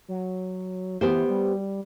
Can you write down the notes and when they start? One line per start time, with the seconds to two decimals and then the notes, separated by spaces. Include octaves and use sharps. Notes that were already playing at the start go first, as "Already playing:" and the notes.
0.08 F#3
1.01 E3 B3 G4 C5
1.29 G3